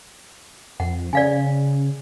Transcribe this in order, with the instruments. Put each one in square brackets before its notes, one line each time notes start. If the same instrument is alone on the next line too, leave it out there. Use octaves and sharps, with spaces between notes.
[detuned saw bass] F2 [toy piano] F#5
[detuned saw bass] C#3 [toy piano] D5 F5 G#5